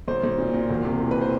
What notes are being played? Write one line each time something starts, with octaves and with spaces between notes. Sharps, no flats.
B1 C5
B1
A#2
A#2
E1
C3
E3
B4
C5